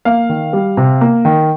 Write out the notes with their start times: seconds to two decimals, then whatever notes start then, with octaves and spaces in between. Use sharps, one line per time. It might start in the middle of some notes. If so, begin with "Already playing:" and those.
0.05 A#3 F5
0.29 D#3
0.53 G3
0.77 C3
1.01 A#3
1.25 D#3